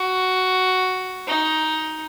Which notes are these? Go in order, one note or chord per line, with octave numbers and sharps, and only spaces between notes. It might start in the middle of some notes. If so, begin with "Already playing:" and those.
Already playing: F#4
D#4